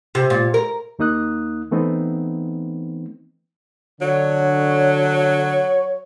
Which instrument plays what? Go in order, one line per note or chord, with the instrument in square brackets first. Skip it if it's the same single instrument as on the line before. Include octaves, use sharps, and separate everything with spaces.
[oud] C3
A#2
A#4
[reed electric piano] D#2 A#3 D#4 D#6 F#6
E3 A3 B3 C4 D#4
[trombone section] D3 [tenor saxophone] F#3 [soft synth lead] C#5